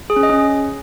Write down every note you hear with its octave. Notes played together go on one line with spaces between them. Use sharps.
G#4
C#4
D#5
C#4